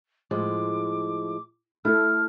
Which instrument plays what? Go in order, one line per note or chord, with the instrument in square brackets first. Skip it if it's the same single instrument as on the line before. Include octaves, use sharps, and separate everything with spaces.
[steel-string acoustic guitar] A2 F3 G#3 [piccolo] D6
[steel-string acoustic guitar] A3 [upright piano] E4 A4 [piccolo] F6